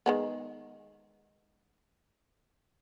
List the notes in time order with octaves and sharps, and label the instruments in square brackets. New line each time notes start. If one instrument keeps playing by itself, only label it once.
[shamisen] D#3 G#3 B3